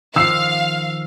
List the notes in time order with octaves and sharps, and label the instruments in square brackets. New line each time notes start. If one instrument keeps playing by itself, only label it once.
[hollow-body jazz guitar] D#3 F3 [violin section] F5 [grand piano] E6 C7